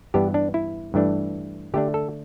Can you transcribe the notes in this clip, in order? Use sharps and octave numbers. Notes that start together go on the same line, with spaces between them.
G2 E3 B3 D4 G4
D4
E4
G2 E3 A3 D4
D3 A3 D4 G4
A4